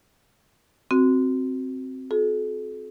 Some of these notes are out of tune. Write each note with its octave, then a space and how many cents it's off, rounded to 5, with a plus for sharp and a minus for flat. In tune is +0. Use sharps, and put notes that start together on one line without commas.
C4 +0 F#4 +0
F#4 -35 A4 -45